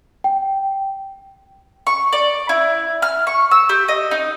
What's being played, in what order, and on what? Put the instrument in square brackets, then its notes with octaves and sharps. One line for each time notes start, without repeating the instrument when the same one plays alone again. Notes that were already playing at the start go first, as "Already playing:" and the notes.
[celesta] G5
[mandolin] C#6
D5
E4
F6
C#6
E6
G4
D#5
D#4